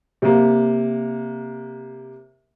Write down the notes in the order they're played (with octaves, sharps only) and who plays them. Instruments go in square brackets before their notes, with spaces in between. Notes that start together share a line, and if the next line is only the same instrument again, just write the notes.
[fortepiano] C3 A#3